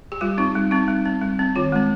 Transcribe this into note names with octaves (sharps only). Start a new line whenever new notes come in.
G4
G3 F4
C4 D#4
G3
C4 D#4
G3
C4
G3
C4
D#3 F4
G#3 C4